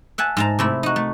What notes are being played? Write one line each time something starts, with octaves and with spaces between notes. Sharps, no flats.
E5 F#5 G#5 A5
G#2 A5 A#5
C3 A3 E4
D#4 F#4
A3